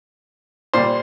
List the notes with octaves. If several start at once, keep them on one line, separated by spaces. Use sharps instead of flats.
A#2 G3 C5